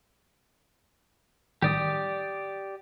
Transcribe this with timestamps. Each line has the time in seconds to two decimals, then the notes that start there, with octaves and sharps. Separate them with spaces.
1.62 A1 D#3 G3 G4 D5 D#6